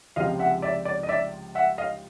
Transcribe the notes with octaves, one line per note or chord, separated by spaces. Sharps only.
C#2 C3 F3 G#3 D#5 F5
E5 F#5
D5 E5
D5
D#5
D5 E5
E5 F#5
D#5 F5